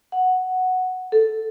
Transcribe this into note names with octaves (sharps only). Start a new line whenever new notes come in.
F#5
A4